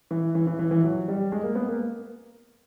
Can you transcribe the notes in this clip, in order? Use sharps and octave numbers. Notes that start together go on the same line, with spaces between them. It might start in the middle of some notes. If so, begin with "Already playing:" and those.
E3
E3
E3
E3
E3
F#3
G3
G#3
A#3
B3
A#3